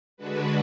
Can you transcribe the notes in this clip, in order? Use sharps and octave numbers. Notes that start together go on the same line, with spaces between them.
D3 G#3 D4 F#4 B4